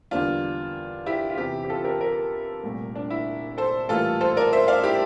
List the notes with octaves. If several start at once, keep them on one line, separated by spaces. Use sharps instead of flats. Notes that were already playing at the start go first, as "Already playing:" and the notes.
E2 D3 G3 A#3 D4 F4
E4 G4
F4
E2 C3 E3 E4 G4
G4
F4 A4
G4 A#4
G4 A#4
C2 A#2 A3
D4
E4
A4 C5
A2 E3 G3 A#3 F4 A4
A4 C5
A#4 D5
C5 E5
D5 F5
E4 G4